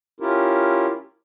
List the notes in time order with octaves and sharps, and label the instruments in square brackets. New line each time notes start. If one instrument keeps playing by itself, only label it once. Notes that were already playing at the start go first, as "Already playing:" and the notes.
[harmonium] C#4 E4 F4 G4 A#4